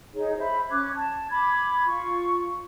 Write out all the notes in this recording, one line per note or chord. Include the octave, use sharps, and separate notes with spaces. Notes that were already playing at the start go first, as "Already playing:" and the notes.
D#4 G#4 C#5
C5 E5 B5
C#4 D6 F#6 G#6
A5
B5 D6 G#6
F4 C#6